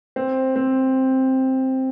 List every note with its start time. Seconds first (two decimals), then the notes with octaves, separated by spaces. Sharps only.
0.16 C4
0.56 C4